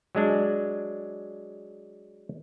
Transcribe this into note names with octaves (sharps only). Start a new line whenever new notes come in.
F#3 G#3 D4